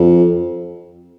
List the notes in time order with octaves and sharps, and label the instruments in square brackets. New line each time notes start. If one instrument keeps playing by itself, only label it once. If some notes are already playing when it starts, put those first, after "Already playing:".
Already playing: [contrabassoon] F2